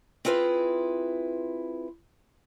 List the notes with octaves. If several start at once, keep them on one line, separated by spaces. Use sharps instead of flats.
C4 E4 F4 G#4 B4